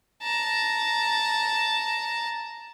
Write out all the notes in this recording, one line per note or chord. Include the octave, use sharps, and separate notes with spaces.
A5 A#5